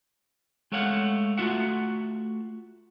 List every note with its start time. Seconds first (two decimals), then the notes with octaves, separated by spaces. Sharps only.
0.72 G#3 A3 C#5 F5 F#5
1.38 A3 F4 F#4 E5 F#5